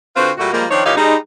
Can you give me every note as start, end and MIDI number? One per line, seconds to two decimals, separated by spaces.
0.16 0.30 50
0.16 0.30 60
0.16 0.30 65
0.16 0.30 66
0.16 0.30 71
0.16 0.30 72
0.37 0.49 46
0.37 0.49 55
0.37 0.49 57
0.37 0.49 66
0.52 0.64 53
0.52 0.64 55
0.52 0.64 56
0.52 0.64 58
0.70 0.81 51
0.70 0.81 53
0.70 0.81 60
0.70 0.81 62
0.70 0.81 63
0.70 0.81 73
0.84 0.92 46
0.84 0.92 52
0.84 0.92 63
0.84 0.92 67
0.84 0.92 73
0.84 0.92 77
0.96 1.15 55
0.96 1.15 56
0.96 1.15 63